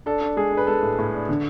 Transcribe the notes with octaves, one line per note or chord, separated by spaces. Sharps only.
D4 A4
D4
G#3 G#4
D4
B4
G#3 A4
A2
A2
D4
D3